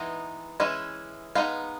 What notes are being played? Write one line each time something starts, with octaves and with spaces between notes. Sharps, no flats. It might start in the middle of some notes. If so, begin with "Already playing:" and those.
Already playing: E3 G#3 B3 D#4
E3 G#3 C#4 E4
G#3 B3 D#4 F5